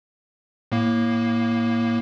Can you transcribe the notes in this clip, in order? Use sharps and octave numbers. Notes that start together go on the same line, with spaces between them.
A2 A#3